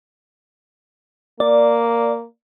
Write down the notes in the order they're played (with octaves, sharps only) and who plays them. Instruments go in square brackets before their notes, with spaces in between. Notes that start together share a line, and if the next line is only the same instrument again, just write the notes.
[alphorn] A#3 [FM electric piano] D5